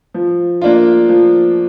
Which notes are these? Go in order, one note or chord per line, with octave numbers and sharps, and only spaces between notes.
F3
A#3 D4 F4
F3